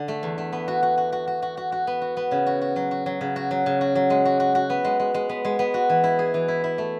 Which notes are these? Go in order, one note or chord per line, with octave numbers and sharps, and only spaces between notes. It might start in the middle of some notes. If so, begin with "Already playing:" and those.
Already playing: D3
A3
E2
A3
B3
F#4
F#4
F#4
F#4
F#4
F#4
F#4
F#4
B3
F#4
B3
C#3
F#4
F#4
F#3
F#4
F#3
C#3
F#4
F#3
C#3
F#4
F#3
G#3
F#4
F#4
F#4
B3
G#3
G#3
G#3
B3
G#3
B3
F#4
E3
E4
G#4
E3
E4
E4
A3